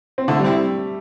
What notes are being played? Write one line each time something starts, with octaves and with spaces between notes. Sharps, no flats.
C4
D3 A3
G3
C4 E4